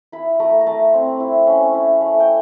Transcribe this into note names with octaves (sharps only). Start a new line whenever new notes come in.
E4 B5
A3 A#5
A#5
A3 A5
C4
E4
C#4
E4
A3
G5